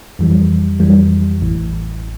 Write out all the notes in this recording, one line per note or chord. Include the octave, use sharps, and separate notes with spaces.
F2 E3 G3
F2 E3 G3
A1 A2 E3